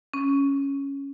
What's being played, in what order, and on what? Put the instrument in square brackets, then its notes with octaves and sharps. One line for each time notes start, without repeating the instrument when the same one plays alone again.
[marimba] C#4